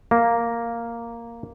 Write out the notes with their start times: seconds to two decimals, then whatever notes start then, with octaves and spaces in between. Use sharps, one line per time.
0.11 A#3